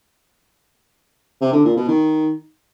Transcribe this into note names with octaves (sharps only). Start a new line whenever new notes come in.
C3
D3
A#2
B2
D#3